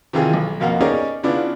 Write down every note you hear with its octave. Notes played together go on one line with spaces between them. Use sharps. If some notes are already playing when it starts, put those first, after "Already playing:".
C3 D#3 E3 F4 G#4
B1
F2 B2 A#3 F5 F#5
C#4 D#4 G4 G#4 A#4 D5
C#3 B3 D4 E4 F4